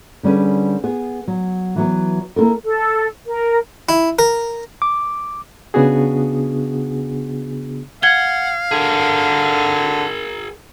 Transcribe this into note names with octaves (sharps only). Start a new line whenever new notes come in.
D3 G3 C#4 G#4 B4
B3 G#4
F#3
E3 F#3 B3
A#3 E4 F4 A4 A#4
A4
A#4
E4
A#4
D6
C#3 B3 D4 F#4 G#4
F5 F#5 G#6 G7
D3 G#4 A#4